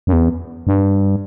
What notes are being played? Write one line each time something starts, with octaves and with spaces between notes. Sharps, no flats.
F#2
E2
G2